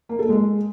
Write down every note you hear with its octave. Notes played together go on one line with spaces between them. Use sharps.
A#3
A4
G#3